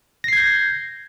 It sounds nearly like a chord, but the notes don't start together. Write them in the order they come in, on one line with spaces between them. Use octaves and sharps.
A#6 C7 G#6 G6